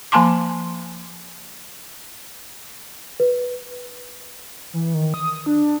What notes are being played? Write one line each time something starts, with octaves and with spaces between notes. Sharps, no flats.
F3 A#3 G#5 A5 C6 D6
B4
E3
D#3
D#6
D4